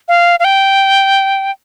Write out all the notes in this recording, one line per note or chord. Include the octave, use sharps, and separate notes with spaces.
F5
F5
G5